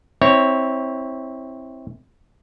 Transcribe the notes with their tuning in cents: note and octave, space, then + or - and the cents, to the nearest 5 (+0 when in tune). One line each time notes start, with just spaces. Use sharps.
C4 +10 E4 -20 C#5 +0